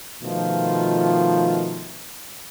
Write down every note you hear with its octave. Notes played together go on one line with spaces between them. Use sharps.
B2 D#3 F3 A3 F4